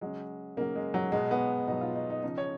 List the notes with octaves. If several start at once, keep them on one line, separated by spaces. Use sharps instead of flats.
C#3 F#3 G#3
C#3 F#3 A#3
G#3
F#3
B2 F#3 G#3
B3
B2 F#3 D#4
F4
D#4
D#4
C#3 F3 D#4
C#5